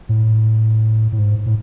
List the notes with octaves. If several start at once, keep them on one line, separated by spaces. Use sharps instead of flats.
A2
A2
G#2
A2